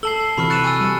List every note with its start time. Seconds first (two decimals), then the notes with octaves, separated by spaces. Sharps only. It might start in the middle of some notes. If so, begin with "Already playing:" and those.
0.03 A4 A5 E6 C7 F#7 G7
0.21 C7
0.38 C3 E3 F#4 B5 C#6 F6
0.50 C#6 F#6 A6 C#7 E7
0.65 G#5 E6
0.80 G3